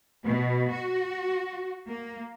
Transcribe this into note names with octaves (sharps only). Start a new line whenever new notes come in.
B2
F#4
A#3